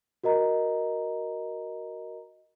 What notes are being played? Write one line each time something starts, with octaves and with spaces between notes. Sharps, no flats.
F#4 A#4 D#5 A#5